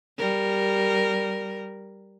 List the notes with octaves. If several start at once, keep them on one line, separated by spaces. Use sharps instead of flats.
G3 A#4